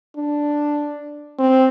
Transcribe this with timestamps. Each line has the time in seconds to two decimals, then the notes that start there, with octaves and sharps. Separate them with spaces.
0.17 D4
1.39 C4